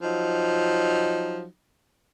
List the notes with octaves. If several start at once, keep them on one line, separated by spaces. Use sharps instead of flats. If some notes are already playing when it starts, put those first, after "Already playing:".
F3 F#3 D#4